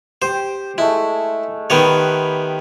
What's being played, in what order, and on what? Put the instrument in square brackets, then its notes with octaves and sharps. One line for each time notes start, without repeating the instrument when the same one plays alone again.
[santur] G4 [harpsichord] C5
[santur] G#3 A3 [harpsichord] E4
[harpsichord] D#3 B3 C#5 [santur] G4 B4 C6